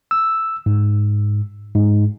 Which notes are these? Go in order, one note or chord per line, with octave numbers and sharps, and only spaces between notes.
E6
G#2
G#2